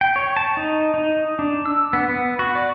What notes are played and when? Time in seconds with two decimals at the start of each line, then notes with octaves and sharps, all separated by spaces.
0.01 G5
0.16 C#5
0.37 A5
0.57 D#4
0.94 D#4
1.39 D4
1.66 E6
1.93 B3
2.09 B3
2.39 F#4
2.55 D5